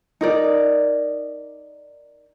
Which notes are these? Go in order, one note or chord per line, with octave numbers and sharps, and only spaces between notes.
D#4 A#4 D5